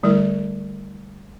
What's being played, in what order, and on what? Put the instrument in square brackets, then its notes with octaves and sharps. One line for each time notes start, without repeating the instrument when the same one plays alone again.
[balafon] D3 G3 A3 E4 A#4